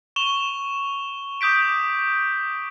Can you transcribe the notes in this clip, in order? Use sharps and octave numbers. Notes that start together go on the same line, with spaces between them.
C#6 E7 F7 G7
D6 D#6 G6 B6 D7